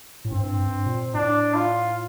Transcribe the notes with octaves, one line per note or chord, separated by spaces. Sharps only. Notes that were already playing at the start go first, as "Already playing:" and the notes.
A2
G2 C4
G2
A#2
A2 D4
F4